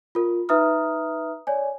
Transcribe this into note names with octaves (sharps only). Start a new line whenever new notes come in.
F4 A#4
D#4 B4 E5 A#5 D#6 F6
C#5 D5 G#5